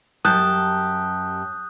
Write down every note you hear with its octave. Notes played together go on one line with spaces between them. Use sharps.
F#2 G4 A5 D#6 F#6 G6